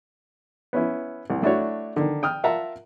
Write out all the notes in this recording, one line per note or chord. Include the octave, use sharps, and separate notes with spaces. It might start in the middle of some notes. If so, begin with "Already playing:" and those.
B3 C#4 E4
C2
A3 D4 E4 F#4 C#5
D3 D#3
G5 D#6 F6
F4 A#4 E5 F#5 A5 A#5